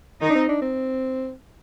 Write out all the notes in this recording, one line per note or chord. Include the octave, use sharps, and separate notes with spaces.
D#3 D#4
D4
C4
D4
C4